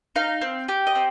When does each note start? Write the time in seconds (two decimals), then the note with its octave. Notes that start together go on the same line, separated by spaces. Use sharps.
0.16 D#4 F5
0.41 C4
0.68 G4
0.87 D#5
0.95 C4